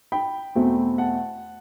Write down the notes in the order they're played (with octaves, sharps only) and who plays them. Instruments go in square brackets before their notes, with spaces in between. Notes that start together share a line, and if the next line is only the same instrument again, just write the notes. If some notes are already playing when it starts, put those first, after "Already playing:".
[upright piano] G5 B5
E2 B2 A3 C4
F#5 A5